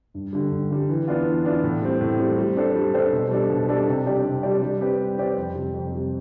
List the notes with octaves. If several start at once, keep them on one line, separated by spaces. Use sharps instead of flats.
G2
D3 G3
G2
D3 G3
E3
B3 D4 F4
E3
B3 D4 F4
A2
G3 C4
A2
G3 C4
G3
D4 A4 C5
G3
D4 A4 C5
B2
G3 D4 A4
B2
G3 D4 A4
C3
G3 D4 G4 D5
C3
G3 D4 G4 D5
G3
C4 G4 B4 D5
G3
C4 G4 B4 D5
F2
C3 G3
F2
C3 G3